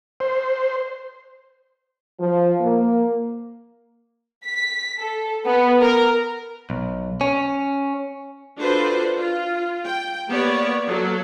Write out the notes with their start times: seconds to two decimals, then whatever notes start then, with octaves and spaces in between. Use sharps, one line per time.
0.20 C5
2.19 F3
2.60 A#3
4.46 B6
5.00 A4
5.46 B3
5.81 A#4
6.70 B1
7.21 C#4
8.57 D4 F4 F#4 A4 B4 C5
9.17 F4
9.84 G5
10.28 A#3 B3 G4 C#5 D5
10.87 F#3 A#3 A4